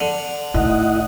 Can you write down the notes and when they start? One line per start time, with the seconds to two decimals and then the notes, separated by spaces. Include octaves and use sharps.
0.01 D3
0.54 A2 D#3 E4 D#5 F#5